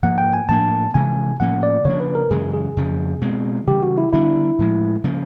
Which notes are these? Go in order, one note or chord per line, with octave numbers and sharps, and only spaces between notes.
G#2 F3 A#3 F#5
G5
G#5
A2 F3 A#3 D4 A5
C3 E3 G#3 G#5
A2 F3 A#3 C#4 F#5
D5
C#3 F3 A#3 D4 C#5
B4
A#4
F#2 C#3 E3 G#3 G#4
G#4
F2 C#3 F3
B2 G#3 C4
C#3 E3 G3 G4
F#4
E4
D3 G3 B3 D4 E4
A2 F3 G#3
C#3 F3 A#3